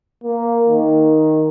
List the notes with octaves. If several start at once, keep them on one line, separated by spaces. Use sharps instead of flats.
A#3
D#3